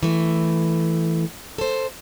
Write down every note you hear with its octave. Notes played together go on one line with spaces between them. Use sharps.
E3 A3
A4 C5